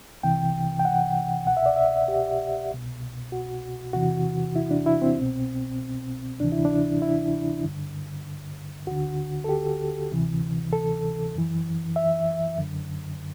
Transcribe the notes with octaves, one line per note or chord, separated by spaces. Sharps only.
C2 C3 E3 G5
G5
F#5
C2 B2 F#5
E5
D5
E5
G4
C2 B2
F#4
E2 C3 E3 F#4
E4
D4
E4
C4
C2 B2
D2 C3 E3 D4
E4
D4
E4
G2 D3
D2 D3 F#4
A4
G4
D2 C3 E3
A4
F#2 E3
E5
F#2 D3